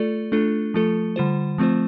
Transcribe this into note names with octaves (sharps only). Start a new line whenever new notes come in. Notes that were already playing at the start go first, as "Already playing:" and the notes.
Already playing: A3 F4 A4 D5
A3 D4 F4 A4
F3 A3 F4 A4
D3 G3 F4 C5
F3 A3 C4 F4 C5